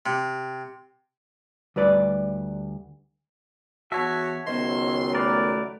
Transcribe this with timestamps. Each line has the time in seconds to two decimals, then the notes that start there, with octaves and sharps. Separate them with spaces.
0.06 C3
1.76 D2 G3 B4 D5
3.92 E2 F#4 C#5 E5 A5
4.47 C#2 D#3 F#3 B3 C5 D#5 C6
5.14 A3 A#4 B4 D5